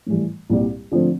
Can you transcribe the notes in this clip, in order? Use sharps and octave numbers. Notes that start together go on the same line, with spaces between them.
A2 E3 G3
C2 A#2 G3
D3 F3 A3 C4